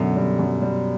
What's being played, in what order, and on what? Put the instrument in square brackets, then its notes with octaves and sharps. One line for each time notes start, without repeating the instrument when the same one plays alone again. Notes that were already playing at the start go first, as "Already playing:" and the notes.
Already playing: [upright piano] F#2 D3 [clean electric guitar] B2
[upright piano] G3
F#2
G3